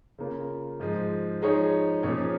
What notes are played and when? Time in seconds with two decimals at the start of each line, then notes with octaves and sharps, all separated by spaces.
0.18 C#3 A#3 F4
0.80 G#2 F3 G#3
1.41 F3 G#3 D#4 G#4 C#5
2.03 A#2 F3 C#4 G#4 C#5